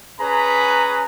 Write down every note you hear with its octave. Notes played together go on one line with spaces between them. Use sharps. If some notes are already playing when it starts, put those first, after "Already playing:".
C#4 G#4 B4 G#5 A#5 B5